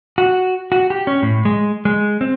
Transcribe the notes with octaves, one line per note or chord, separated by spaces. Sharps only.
F#4
F#4
G4
C#4
A2
G#3
G#3
C4